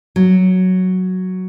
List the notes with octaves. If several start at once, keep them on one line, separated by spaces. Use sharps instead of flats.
F#3